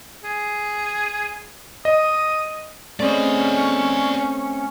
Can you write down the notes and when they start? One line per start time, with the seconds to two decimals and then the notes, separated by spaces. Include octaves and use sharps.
0.24 G#4
1.85 D#5 D#6
3.00 A3 C4 C#4 G#4 D5 D#5